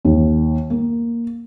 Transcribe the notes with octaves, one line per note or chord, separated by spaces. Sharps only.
D#2
A#3